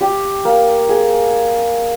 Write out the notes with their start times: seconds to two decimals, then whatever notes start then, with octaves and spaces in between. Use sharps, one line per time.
0.01 G4
0.45 A#3
0.89 G#4